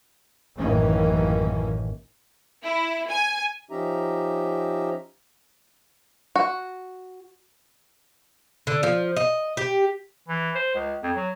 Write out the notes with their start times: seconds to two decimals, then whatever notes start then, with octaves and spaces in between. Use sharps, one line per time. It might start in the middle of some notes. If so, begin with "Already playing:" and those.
0.58 A1 F#2 D#3 E3 A#3 C#4
2.64 E4
3.08 G#5
3.71 F3 C#4 D#4 G4 E5 A#5
6.36 F#4
8.67 D3
8.83 F3
9.17 D#5
9.57 G4
10.28 E3
10.55 C5
10.74 C#2
11.03 F2
11.15 F#3